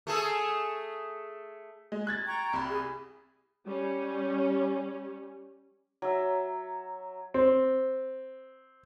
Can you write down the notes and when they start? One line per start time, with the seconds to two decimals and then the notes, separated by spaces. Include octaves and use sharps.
0.07 A3 G#4 A4
1.92 G#3
2.07 F#6 G#6 A6
2.26 G5 A#5 C#6
2.53 C2 B5
2.68 G#4
3.65 G3 C#4
6.02 F#3 E5
7.34 C4